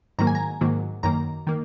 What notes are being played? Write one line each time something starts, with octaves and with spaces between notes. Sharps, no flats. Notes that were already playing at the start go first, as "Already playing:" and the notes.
G#2 D#3 F#3 A#3 A#5
G#5
A#5
G#2 D#3 F#3 A#3
F#2 D#3 A#3 A#5
D#3 A#3